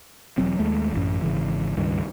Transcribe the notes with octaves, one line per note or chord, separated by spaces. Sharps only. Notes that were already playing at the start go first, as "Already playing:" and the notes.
E1 F#3 C4
D#2 G#3 A3
A1 F#2
G#1 C#3 E3
C#2 G2 D#3